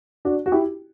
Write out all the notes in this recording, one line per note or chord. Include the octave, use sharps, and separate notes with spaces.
D4 F#4
F#4
E4 G4